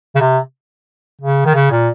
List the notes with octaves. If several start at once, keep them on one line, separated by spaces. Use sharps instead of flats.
C#3
C3
C#3
D#3
C#3
A#2